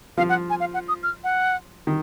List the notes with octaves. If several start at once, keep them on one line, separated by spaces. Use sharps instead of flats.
F3 F5
F#5
G#5
F5
F#5
D#6
F6
F#5
D#3